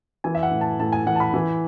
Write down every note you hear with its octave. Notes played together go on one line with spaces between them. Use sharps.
E3 G#5
E5
F#5
A2
A5
A2 A5
G#5
E3 F#5
A5
B5
E3